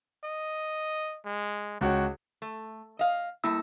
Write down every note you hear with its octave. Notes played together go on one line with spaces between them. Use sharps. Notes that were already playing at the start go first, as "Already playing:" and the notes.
D#5
G#3
C#2 F#4 C#5 G5
A3
D#5 F5
G3 A3 A#3 E4 E6